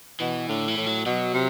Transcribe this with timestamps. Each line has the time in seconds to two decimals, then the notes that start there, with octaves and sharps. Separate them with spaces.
0.20 B2 E3
0.49 A2 D3
0.68 E3
0.77 A2
0.86 F#3
1.06 B2 F#3
1.34 C3